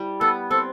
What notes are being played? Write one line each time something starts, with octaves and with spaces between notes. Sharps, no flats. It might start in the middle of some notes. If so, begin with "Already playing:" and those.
Already playing: G3 E4
B3 A4
C4 A4